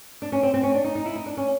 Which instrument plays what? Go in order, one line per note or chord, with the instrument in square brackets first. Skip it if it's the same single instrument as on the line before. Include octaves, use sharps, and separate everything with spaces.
[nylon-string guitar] D4
C#4
C4
C4
C#4
D4
D#4
D#4
E4
D#4
D4
C#4